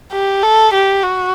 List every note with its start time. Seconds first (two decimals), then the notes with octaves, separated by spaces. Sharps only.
0.12 G4
0.43 A4
0.74 G4
1.03 F#4